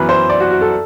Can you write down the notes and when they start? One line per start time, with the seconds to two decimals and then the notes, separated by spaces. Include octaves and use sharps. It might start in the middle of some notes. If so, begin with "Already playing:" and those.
Already playing: F#2 E3 B3 B4
0.09 C5
0.29 D5
0.40 F#4
0.51 F#4
0.61 A4